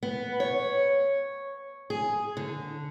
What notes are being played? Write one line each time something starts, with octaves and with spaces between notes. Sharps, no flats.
B3
C#5
G#4
D3